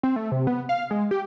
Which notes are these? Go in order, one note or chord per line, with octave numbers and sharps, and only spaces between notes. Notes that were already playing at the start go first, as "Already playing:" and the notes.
C4
A3
C3
B3
F5
G#3
G4